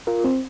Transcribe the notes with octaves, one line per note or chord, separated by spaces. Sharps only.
F4 A#4
C4